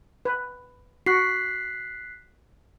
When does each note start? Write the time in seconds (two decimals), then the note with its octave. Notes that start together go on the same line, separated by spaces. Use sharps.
0.25 B4
1.06 F#4 F#6 B6 C7